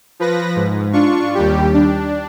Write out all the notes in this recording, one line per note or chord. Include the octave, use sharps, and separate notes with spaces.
F3 B4 A#6
G#2
D4 F4 C#6
D#2 G3 G4
D4